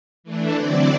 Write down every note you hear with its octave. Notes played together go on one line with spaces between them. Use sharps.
E3 A3 D4
D3 F#3 C4 E4 D5